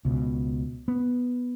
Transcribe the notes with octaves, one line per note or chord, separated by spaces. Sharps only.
C#2 B2
B3